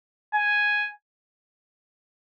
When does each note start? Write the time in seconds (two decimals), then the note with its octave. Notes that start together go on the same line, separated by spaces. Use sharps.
0.35 G#5